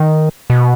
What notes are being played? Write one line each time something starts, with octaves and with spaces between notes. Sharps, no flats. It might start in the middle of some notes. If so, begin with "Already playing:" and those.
Already playing: D#3
B2